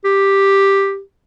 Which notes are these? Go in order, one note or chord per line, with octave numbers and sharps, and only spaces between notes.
G4